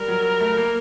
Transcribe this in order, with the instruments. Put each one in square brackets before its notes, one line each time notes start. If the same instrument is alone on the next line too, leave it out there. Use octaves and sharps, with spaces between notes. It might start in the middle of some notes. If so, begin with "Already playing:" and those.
Already playing: [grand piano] G3 [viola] A#4
[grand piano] F#3
A3
A#3